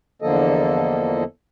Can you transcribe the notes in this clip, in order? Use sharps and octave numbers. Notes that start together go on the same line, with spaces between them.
E2 D3 F3 A#3 A4 D#5